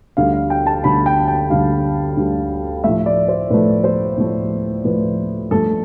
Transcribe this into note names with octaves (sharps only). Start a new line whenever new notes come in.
D2 D3 G3 F5
F5
G5
A5
D2 D3 G3 B5
G5
G5
D2 D3 G3 F5
D2 D3 G3
A2 F3 A3 E5
D5
C5
A2 F3 A3 B4
C5
A2 F3 A3
A2 F3 A3 B4
G2 F3 A3 A4